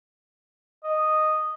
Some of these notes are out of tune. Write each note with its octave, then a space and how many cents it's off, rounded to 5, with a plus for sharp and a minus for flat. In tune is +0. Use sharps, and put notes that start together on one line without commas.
D#5 -5